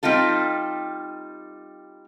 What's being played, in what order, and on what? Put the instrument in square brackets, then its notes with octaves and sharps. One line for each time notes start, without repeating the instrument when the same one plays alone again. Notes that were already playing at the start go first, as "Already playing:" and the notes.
[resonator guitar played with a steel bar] G3 C4 D#4 F4 A4